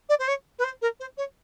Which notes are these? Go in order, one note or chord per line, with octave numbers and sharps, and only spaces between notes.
D5
C5
C#5
B4
C5
A#4
C5
C#5